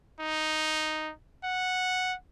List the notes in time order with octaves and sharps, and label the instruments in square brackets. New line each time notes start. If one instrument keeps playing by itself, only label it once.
[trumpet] D#4
F#5